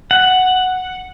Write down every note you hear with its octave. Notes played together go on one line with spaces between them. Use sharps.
F#5